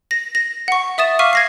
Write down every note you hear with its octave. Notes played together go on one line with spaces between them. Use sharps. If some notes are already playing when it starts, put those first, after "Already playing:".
A#6
A#6
F#5 C#6
E5 D#6 A6 E7
F5 C#6 D6 F6 B6 D#7
G#6 A#6 C7